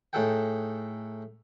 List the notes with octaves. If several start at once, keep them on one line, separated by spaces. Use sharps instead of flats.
A2 D#4 G#4 A4 F#5 G5